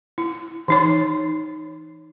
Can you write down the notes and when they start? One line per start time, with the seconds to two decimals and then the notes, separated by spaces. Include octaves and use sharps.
0.18 E4
0.68 E3 D#4 C#5